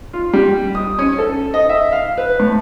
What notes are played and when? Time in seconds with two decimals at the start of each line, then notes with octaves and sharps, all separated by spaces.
0.13 F4
0.33 G3
0.75 D#6
0.99 C#4
1.18 A4
1.54 D#5
1.69 E5
1.92 F5
2.18 B4
2.40 A2